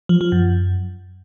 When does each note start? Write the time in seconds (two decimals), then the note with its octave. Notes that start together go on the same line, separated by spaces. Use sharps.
0.09 F3
0.21 F3
0.32 F#2